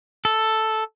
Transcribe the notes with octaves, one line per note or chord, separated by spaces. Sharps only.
A4